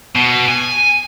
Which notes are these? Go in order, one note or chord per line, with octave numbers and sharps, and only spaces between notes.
B2
G#5